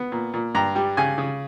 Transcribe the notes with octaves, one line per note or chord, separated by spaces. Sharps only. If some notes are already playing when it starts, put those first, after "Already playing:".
Already playing: B3
A#2
A#2
G2 A#5
G3
C#3 G#5
C#3